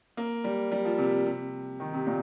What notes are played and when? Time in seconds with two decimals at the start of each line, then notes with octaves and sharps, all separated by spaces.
0.17 A#3
0.44 G3
0.72 G3
0.85 F3
0.98 C3
1.26 C3
1.80 D#3
1.93 C3
2.07 A#2